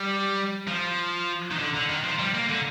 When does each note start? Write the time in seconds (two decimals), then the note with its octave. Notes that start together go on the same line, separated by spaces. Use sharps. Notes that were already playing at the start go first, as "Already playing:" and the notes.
Already playing: G3
0.68 F3
1.51 D#3
1.59 D3
1.74 D3
1.89 D#3
2.04 F3
2.19 G3
2.34 A#3
2.49 D3